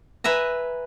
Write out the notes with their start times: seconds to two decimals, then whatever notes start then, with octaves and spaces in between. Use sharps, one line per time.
0.24 B4 E5 G#5 A#5